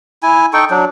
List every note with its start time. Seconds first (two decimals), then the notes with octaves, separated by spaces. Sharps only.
0.23 E4 G#5
0.53 D#4 A4 G5 C#6
0.70 F#3 D4